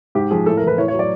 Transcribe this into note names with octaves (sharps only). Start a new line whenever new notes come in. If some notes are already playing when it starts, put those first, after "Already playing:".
G#2 G4
F3 G#4
A2 A4
A#4
E3
B4
A2 C#5
C#5
F#3
D5